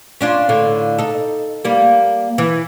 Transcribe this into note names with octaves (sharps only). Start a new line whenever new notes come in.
C#4 D4 F4
A2 D3 F5
D#4 A4
G3 A#3
E3